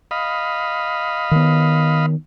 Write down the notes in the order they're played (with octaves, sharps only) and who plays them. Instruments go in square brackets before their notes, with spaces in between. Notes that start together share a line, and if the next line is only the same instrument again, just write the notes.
[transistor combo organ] D#5 F5 B5
[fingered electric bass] D#3 B3